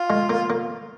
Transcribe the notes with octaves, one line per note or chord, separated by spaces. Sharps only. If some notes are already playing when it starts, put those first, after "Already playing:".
Already playing: F4
G#3
A#3
A#3